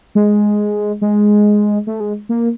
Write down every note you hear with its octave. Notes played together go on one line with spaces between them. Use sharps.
G#3
G#3
A3
G#3
A#3